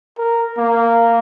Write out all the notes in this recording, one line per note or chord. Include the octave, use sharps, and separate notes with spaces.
A#4
A#3